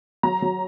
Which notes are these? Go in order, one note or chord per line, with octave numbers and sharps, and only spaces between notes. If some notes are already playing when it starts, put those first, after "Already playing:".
F#3 A#5
F#3